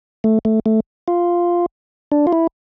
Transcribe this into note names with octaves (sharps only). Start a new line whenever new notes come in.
A3
A3
A3
F4
D4
F4
E4